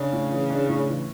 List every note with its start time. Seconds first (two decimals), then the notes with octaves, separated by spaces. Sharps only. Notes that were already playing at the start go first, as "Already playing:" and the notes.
Already playing: C#3 D4
0.13 A2
0.31 E3
0.50 D4
0.69 A2
0.88 E3